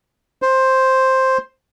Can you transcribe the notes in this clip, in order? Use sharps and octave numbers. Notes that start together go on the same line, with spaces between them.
C5